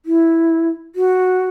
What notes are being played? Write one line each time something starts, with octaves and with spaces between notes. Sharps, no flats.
E4
F#4